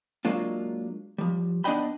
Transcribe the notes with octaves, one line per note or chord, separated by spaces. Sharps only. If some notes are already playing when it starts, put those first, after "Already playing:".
F#3 G#3 A#3 D4 F4
F3 G3
B3 D4 D5 D#5 G5 B5